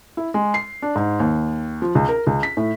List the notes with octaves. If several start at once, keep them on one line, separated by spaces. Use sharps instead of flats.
E4
G#3
C7
D4
G#2
D#2
F3
C#2
A#4
C#2
B6
A2